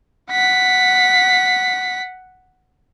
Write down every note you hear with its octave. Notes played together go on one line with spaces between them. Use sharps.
F#5 B6